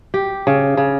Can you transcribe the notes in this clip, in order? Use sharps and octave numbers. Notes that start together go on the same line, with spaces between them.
G4
C#3
C#3